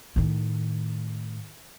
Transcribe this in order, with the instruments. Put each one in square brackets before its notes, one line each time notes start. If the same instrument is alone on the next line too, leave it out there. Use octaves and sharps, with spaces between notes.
[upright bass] A2 D#3